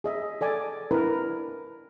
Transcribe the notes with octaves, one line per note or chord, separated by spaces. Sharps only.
G#4 D#5 E5
A4 D5 G#5 D6
D4 E4 A#4 B4